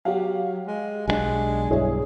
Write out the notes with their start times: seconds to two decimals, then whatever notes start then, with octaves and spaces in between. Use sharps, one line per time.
0.05 F#3 G4 F5
0.67 G#3
1.08 B1 E3 G#3 D4
1.70 B1 G2 E4 G#4 C#5